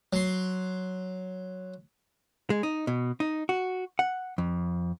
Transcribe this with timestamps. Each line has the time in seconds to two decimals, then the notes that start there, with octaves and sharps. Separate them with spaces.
0.13 F#3 C6
2.50 G#3
2.63 D#4
2.87 B2
3.20 D#4
3.49 F#4
3.99 F#5
4.38 F2